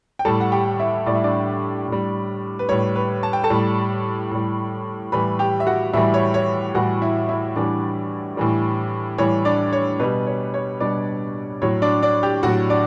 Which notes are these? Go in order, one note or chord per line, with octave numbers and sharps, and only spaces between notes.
G5
A2 G3 A4 A5
F#5
G4 G5
E4 E5
A2 G3 D5
E5
D4 D5
A2 G3
B4
A2 G3 C#5
B4
A5
G5
A4 A5
A2 G3
A2 G3
A2 E3 G3 B4 B5
G4 G5
E5
F#4 F#5
A2 E3 G3 E4 E5
C#5
C#5
A2 E3 G3 F#4 F#5
E4 E5
E4 E5
A2 E3 G3 D4 D5
A2 E3 G3
A2 E3 G3 C#5
D4 D5
C#5
B2 G3 B4
C#5
C#5
B2 G3 D4 D5
A2 F#3 C#5
D4 D5
D4 D5
G4 G5
A2 F#3 F#4 F#5
D4 D5